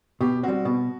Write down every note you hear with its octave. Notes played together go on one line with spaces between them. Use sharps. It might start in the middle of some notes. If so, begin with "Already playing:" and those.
B2 G4
G3 C4 F#4
B2